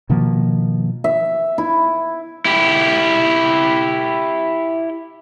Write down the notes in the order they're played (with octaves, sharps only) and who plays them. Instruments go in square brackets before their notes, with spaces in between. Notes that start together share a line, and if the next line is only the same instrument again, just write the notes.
[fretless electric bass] B2 D#3 F3 A#3
[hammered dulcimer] E5
E4
[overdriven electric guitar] E4 G4